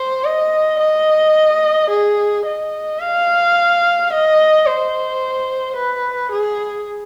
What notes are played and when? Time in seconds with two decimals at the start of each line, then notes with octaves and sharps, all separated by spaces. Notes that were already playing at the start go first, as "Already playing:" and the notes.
Already playing: C5
0.25 D#5
0.79 D#5
1.90 G#4
2.46 D#5
3.00 F5
4.11 D#5
4.66 C5
5.76 B4
6.32 G#4